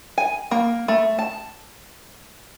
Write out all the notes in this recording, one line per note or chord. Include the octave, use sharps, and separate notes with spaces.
G#5
A#3
A3
A5